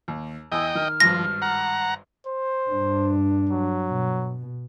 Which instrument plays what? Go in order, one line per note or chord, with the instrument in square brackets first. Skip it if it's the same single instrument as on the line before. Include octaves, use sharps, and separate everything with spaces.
[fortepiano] D#2
[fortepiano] E2 G#5 D#6 [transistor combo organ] D#5 G5 [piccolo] E6
[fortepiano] D#3 [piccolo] F6
[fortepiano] G#1 G2 [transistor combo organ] F3 [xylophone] A#6
[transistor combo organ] F#5 A#5
[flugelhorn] C5
[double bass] G2 D4
[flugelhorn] F#3
[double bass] B2